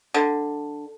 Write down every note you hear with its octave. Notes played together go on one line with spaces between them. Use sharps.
D3